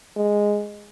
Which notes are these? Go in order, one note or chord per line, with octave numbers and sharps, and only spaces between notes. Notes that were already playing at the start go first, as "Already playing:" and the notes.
G#3